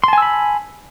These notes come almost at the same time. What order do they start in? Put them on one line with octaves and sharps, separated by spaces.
C6 A5 G#5 E6 B5